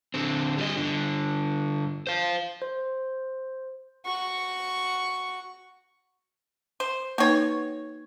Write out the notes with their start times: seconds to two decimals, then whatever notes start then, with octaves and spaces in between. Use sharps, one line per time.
0.14 D3 C4
0.58 G3 D#5
0.77 G2 D3
2.07 C5 F5
2.62 C5
4.06 F#4 C#6
6.80 C5
7.18 A#3 D#4 F#4 B4 C#5